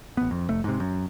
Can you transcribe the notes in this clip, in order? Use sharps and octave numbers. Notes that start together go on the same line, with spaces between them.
A1 B3
F2
F1 A3
G#2 C3
F#2